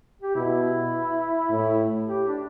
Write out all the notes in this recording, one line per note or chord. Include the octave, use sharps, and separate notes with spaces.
G4
B2 E4
A2
G4
D4